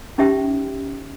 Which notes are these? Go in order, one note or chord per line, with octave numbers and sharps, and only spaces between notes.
C#4 D#4 G4 E5 G5